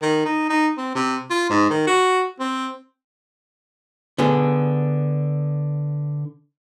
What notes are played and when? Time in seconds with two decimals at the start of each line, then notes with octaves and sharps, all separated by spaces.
0.02 D#3
0.25 D#4
0.49 D#4
0.78 C4
0.95 C3
1.30 F4
1.50 G#2
1.70 D#3
1.87 F#4
2.40 C4
4.18 D3 B3 G#4